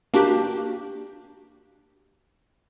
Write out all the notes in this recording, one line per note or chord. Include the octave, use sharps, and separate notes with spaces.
A#3 D4 F#4 G4